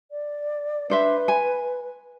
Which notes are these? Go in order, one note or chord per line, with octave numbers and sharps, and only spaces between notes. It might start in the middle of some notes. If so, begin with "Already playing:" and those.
D5
D4 B4 C5 E5
G#5